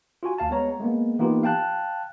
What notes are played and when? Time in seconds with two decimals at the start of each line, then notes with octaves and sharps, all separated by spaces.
0.23 F4 F#4 G#5
0.38 D2 F5 A5
0.50 G#3 B3 C#5 A#5
0.80 G#3 A#3 B3
1.19 E3 A#3 B3 D#4 F4 G4
1.43 F5 G5 A5 F#6